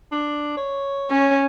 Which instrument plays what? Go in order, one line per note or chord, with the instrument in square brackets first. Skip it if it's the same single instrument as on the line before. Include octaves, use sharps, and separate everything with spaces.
[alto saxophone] D4
C#5
[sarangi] C#4